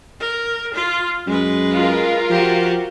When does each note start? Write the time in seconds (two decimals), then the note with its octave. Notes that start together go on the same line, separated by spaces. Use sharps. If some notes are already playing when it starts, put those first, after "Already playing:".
0.20 A#4
0.74 F4
1.26 F#2 G#3 B4
1.75 F4 A#4
2.30 F3 F#4 G4